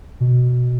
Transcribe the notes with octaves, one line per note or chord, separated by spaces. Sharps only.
B2